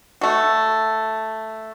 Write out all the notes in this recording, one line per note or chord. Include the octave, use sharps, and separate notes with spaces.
A3 F#4